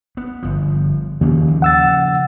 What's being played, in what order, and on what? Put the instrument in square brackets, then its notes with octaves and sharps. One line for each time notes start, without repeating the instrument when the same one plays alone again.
[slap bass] B3
G1 F3
[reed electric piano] D#2 [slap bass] C#3 F3 A#3
[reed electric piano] F#5 E6 A6